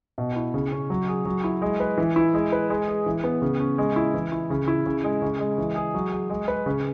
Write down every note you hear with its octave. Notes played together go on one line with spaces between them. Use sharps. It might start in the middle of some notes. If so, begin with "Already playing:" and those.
B2
E4
C#3
C#4
F#3
G#4
F#3
E4
G#3
B4
E3
E4
G#3
B4
G#3
G#4
E3
B3
C#3
C#4
G#3
E4
E3
E4
C#3
E4
C#3
G#3
C#3
G#3
E3
G#4
F#3
G#4
G#3
B4
C#3